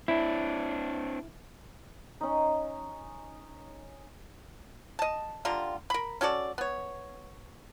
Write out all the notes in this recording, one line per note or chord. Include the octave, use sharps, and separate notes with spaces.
C4 D4 E4
C#4 D#4
D#5 A5
D3 G3 F4 A#5
A#4 B5
C#4 F#4 A4 D5
B3 C#5